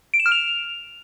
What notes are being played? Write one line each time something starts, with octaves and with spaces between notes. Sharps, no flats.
D7
E7
F6
F7